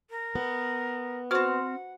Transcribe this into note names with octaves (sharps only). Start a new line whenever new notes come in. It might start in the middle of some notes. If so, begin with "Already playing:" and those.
A#4
B3
C4 F#4 C5 F#5 C#6 F6